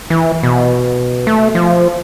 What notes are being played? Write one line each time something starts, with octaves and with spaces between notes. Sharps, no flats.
E3
B2
A3
F3